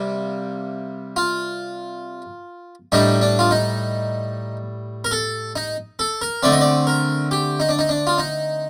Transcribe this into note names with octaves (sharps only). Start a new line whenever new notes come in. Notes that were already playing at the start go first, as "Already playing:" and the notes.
Already playing: C3 G3 A#3
F4
A2 G3 D4 D#4
D4
F4
D#4
A#4
A4
D#4
A4
A#4
D3 A3 C4 D5
D#5
D5
A#4
G4
D#4
D4
D#4
D4
F4
D#4